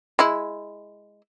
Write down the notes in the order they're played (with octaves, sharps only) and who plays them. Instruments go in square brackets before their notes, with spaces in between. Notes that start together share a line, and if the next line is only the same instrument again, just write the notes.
[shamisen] G#3 E4